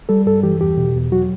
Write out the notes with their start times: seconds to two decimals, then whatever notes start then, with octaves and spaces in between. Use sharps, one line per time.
0.09 G3 A4
0.26 G2 A4
0.43 E3 G4
0.60 E2 G4
0.77 B2
0.94 E2
1.12 F#3 F#4